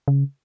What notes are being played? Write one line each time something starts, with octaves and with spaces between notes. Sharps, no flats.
C#3